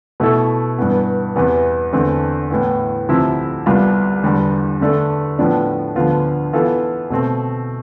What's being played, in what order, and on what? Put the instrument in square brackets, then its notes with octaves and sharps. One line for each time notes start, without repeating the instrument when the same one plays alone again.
[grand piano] B2 A3 E4 A4
G2 E3 B3
E2 C3 E3 B3
E2 D3 A3 C4
A2 E3 B3
D2 C3 F3 C4 E4
C2 C3 G3 B3 F4
E2 D3 G3
D3 A3 D4 A4
A2 F3 B3 D4
D2 D3 F3 B3 F4
E3 B3 F4 A4
B2 A3 C4